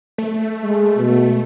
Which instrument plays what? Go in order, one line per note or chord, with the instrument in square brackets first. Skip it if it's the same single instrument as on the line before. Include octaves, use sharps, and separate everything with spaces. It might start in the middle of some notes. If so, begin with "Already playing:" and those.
[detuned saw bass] A3
[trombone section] G#3
B2